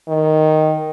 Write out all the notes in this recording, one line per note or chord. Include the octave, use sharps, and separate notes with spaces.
D#3